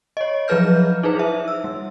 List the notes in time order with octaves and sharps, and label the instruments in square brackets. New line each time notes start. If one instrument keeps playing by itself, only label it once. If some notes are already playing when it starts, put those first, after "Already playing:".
[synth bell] C#5 D#5
F3 F#3 G#4 B4 F6 G6
D#4 E4 G#4 B4 C5
E5
E6
G3